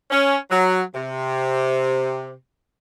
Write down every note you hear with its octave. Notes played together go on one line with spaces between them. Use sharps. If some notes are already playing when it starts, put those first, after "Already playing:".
C#4
F#3
C3